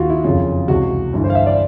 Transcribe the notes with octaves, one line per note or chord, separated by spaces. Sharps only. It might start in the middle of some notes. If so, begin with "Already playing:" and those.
Already playing: D#2 D#3 F4 F#4
E4
F#1 F2 C#3 F4
C#2 C3 E3 F#4
G1 G2 E3
C5
F5
E5
D5